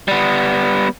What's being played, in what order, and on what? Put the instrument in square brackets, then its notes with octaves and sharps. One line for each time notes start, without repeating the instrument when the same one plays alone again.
[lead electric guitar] G3 B3